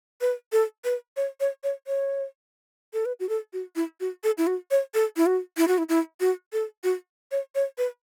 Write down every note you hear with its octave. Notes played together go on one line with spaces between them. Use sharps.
B4
A4
B4
C#5
C#5
C#5
C#5
A4
B4
F#4
A4
F#4
E4
F#4
A4
E4
F#4
C#5
A4
E4
F#4
E4
F#4
E4
E4
F#4
A4
F#4
C#5
C#5
B4